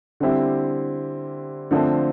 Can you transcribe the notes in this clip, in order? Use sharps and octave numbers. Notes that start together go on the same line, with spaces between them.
D3 G3 C4 E4 G4
D3 F3 A3 C4